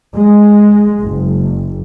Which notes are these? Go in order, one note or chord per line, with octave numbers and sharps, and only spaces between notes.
G#3
F#1